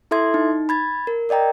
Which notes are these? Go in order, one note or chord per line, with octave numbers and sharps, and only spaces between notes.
E4 A4 E5 C6 G#6
D#4
B5 G#6 A6
A#4
A#4 D5 D#5 G5 A#5